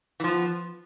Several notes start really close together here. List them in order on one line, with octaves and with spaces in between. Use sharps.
E3 F3 B3